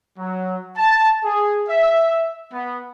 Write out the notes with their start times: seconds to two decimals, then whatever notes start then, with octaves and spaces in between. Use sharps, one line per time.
0.18 F#3
0.77 A5
1.24 G#4
1.68 E5
2.52 B3